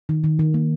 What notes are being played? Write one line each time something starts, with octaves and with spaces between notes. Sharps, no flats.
D#3
D#3
D#3
A#3